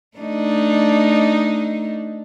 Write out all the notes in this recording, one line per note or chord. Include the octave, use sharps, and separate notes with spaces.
A3 D4 D#4